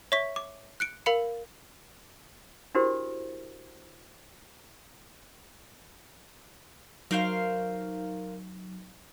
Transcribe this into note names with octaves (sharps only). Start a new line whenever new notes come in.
C#5 E5 C#6 B6
D6
F#6 C#7 D7
A#4 F5 B5 C#7
D4 E4 F#4 G4 A#4 C5
F#3 D#4 A#4 C5 F5